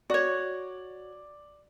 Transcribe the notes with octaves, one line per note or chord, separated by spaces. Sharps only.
F#4 C#5 D5